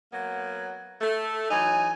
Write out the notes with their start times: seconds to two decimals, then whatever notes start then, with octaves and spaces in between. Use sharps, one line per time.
0.13 F#3 A#3 B3
1.01 A3
1.51 E3 F#3 D#4 G#5